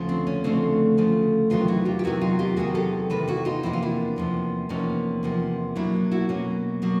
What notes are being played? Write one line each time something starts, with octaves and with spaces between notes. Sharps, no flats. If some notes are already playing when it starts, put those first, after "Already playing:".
Already playing: D2 C#3 F3
C4 D4
C#4
D2 C#3 F3 A3 C4 D4
D2 C#3 F3 A3
E2 C3 D#3 F#3 B3 D#4 F4
E4 F#4
F4 G4
G4
E2 C3 D#3 F#3 B3 E4 F#4
D#4 F4
F4 G4
E2 C3 D#3 F#3 B3 F#4 G#4
G4 A4
E2 C3 D#3 A4 B4
E4 F#4
D#4 F4
E2 C3 F3 A#3 E4
F4
D4 E4
E2 C3 F3 A#3
E2 C3 F3 A#3 C#4 D#4
E2 C3 F3 A#3
B2 F#3 A#3 D4 E4
E4 F#4
B2 F#3 A#3 C#4
B2 F#3 A#3